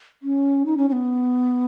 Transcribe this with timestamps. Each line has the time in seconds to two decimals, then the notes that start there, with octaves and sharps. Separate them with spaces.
0.23 C#4
0.66 D#4
0.77 C#4
0.89 C#4
0.92 B3